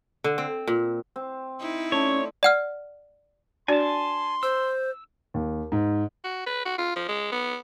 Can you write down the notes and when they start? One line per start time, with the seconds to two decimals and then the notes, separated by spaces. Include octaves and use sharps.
0.24 D3
0.38 C4
0.67 A#2
1.16 C4
1.60 D#4 E4
1.92 A3 C#4 C#5 D5
2.43 D5 F#5 F6
3.68 D4 F#4 D5 G#5 A5 C6
4.43 C5 E6
5.34 D#2
5.72 G#2
6.24 F#4
6.46 B4
6.65 F#4
6.78 F4
6.96 F3
7.09 G#3
7.32 B3